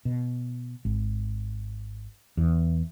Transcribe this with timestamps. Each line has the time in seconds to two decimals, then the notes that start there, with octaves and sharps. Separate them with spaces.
0.05 B2
0.85 G#1
2.37 E2